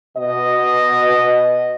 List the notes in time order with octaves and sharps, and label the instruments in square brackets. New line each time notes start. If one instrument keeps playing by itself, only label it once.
[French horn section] B2 D#5